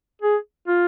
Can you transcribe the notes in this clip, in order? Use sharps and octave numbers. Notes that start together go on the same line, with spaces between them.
G#4
F4